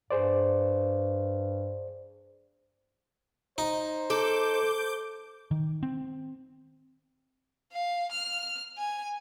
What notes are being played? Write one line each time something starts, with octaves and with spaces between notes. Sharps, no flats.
G2 G#4 C5 D5
D#4 C5
A4 D6 G6
D#3
C4
F5
F6
G#5